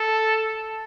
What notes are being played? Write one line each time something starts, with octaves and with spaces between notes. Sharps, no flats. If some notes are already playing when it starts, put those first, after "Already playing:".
Already playing: A4